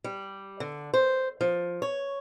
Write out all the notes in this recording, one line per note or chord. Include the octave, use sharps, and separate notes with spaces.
G3
D3
C5
F3
C#5